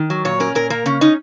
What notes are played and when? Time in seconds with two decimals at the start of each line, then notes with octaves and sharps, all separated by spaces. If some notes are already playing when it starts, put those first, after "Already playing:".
Already playing: D#3
0.10 F#3
0.25 A#2 C#5
0.40 C#4 A#4
0.55 A#2 A#4
0.70 A#3 A#4
0.86 C#3 C#4
1.01 C#4 D#4